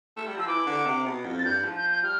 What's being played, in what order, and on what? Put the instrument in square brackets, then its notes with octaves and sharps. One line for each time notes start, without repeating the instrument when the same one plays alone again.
[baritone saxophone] A3
G3
[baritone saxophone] F3 [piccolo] E6
[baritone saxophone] E3 [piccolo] D6
[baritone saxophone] D3
C3
B2
F2
[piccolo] A6
[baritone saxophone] G2 [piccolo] G6
[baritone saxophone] F3
[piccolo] G6
G6
[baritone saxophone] G3 [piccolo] F6